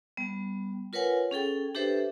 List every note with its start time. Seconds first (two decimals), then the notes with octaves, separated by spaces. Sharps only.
0.17 G3 B3
0.93 F4 A#4 B4 C#5 F#5 G#5
1.31 C#4 G#4 A4 G5
1.75 D4 G4 A4 B4 C5 E5